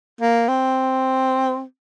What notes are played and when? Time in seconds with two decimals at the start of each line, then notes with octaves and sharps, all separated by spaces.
0.21 A#3
0.48 C4